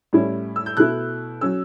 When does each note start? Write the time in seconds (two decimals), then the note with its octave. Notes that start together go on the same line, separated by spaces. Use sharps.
0.13 A2 G3 C#4 E4
0.56 E6
0.66 G6
0.77 B2 A3 E4 F#6
1.41 F#3 C#4 E6